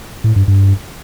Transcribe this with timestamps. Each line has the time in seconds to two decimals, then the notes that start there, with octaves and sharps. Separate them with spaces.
0.24 A2
0.36 G2
0.48 G2